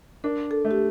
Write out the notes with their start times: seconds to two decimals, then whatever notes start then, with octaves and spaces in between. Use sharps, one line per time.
0.24 D4 A#4
0.51 A4
0.65 A3
0.71 G4